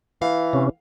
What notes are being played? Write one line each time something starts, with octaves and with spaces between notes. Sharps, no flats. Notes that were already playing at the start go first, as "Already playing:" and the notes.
E3 F5
C3 C#4